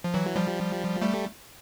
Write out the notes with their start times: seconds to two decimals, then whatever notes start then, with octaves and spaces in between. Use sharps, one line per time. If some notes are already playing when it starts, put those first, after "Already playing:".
0.04 F3
0.14 E3 F#3
0.35 F3 G3
1.02 G3 A3